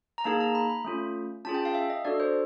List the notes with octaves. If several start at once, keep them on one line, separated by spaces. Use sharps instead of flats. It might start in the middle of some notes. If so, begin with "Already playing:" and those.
A#5
A#3 D#4 G#4 A5
A#5
B5
B5
A3 C#4 F4
C#4 F4 G#4 A5
G5
F5
E5
D#5
D4 F#4 A4 D5
C5